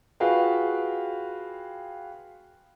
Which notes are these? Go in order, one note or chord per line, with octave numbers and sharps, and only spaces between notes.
F4 F#4 G#4 B4 F5 G5